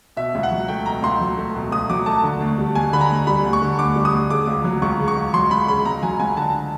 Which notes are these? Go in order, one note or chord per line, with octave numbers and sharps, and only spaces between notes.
B2 E5
C#2
F#5
F#3
A3 G5
B2 A#5
C#2 C6
F#3
A3
B2
C#2 D#6
F#3 D6
A3 A5
D3
D2
G3
D2 G#5
D3 B5
A#5
D2
G3 B5
D2
C#6
D3
D2 D6
G3
D#6
D2
C#3 D6
C#2
F#3
C#2 C#6
C#3
C#6
C#2
F#3 C6
C#2 B5
C#3 B5
C#2 A#5
F#3 G#5
C#2 G#5
D3 A5